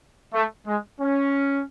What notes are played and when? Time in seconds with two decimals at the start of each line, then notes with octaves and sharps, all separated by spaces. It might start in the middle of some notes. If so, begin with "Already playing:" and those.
0.33 A3
0.67 G#3
1.01 C#4